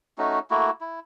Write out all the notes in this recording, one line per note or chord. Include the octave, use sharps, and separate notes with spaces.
A3 C#4 D#4 F#4
A3 A#3 E4 F#4
E4